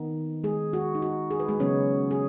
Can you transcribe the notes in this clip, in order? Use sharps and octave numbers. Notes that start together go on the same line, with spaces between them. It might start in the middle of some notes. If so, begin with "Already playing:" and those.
Already playing: D#3 B3 D#4
G#3 G#4
F#4
D#4
F#4
G#4
B4
G#3 G#4
C#3 F#3 B3 C#4 C#5
G#4